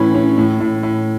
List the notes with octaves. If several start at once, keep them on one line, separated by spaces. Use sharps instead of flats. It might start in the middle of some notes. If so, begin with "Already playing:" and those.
Already playing: A2 E3 C#4 B5
C#4
A2
A2
A2